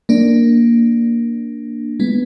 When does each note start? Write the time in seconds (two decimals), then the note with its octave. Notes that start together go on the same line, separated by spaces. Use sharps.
0.09 A#3 D4
2.00 G#3 B3